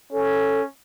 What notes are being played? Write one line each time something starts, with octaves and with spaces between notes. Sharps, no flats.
C#4 A4